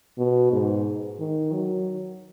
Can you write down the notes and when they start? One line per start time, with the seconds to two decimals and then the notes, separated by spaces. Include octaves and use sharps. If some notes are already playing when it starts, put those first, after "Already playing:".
0.18 B2
0.52 G#2
1.20 D#3
1.53 F#3